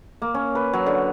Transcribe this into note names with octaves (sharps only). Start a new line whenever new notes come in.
A#3
C#4
B4
F#3
D3